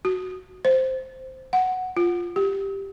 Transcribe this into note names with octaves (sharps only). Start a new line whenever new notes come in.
F#4
C5
F#5
F4
G4